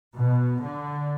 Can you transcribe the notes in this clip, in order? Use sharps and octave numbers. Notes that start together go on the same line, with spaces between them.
B2
D3